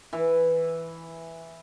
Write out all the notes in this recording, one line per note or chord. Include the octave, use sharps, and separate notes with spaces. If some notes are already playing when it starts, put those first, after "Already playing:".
E3